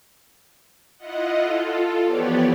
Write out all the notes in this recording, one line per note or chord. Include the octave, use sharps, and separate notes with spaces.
E4 F4 D#5 F#5
F4 A4
E3 F3 B3 G4 C#5 D5